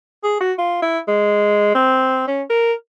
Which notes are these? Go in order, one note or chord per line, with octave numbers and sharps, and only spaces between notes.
G#4
F#4
F4
E4
G#3
C4
C#4
A#4